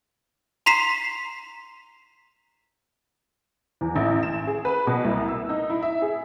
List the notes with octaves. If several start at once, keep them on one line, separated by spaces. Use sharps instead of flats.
A#5 C6 B6 C7 E7
E2
A1
E7
G#4
B4
B2
C2
E6
D#4
E4
E5
G#4